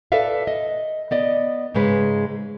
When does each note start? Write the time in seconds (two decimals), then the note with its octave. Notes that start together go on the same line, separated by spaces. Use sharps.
0.12 A4 B4 D5 E5 F5
0.47 D#5
1.11 B3 D5 D#5
1.75 G#2 C#3 G#3 B4